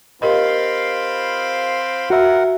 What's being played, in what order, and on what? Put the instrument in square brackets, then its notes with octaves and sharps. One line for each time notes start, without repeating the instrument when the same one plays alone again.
[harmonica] C4 F4 [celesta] G4 A#4 D#5 [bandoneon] F5 B5 C6
[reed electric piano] F#4 E5 [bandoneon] A#4 F#5